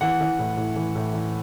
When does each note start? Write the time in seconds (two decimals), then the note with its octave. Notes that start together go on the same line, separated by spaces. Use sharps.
0.01 E3 F#5
0.21 E3
0.39 A2
0.57 A2
0.76 E3
0.95 A2
1.13 E3